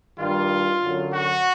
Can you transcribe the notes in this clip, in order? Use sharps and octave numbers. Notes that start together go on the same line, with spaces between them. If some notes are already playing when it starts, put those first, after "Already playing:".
G2 D#3 G3 F4
F#2 D3 F#3
F#4